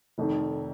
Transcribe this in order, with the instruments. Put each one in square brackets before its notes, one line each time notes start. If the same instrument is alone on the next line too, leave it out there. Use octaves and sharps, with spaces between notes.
[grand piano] F1 F2 D#3